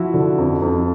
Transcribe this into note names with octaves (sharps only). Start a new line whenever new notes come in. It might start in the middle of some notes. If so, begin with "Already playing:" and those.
Already playing: F3 E4 F#4
D3
F2
F2